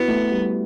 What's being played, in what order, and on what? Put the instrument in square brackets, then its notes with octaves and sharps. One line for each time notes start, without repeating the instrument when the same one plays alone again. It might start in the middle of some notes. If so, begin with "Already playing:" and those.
Already playing: [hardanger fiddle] B3 [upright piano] E4 F#4
[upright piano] A3
G3